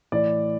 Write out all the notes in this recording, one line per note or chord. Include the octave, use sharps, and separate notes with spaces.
A2 E3 D5